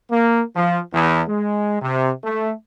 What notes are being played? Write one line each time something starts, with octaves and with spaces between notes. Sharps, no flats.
A#3
F3
E2
G#3
C3
A3